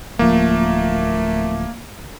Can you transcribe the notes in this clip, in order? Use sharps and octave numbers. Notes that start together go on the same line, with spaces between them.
D1 F3 A3 A#3